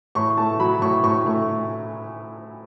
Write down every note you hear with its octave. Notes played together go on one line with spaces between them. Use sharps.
A2 C#6
A3 A5
F#3 B5
A2 C#6
A2 C#6
A3